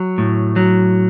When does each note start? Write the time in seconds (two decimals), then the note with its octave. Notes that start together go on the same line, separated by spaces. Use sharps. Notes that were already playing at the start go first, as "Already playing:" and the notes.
Already playing: F#3
0.18 A2
0.56 F#3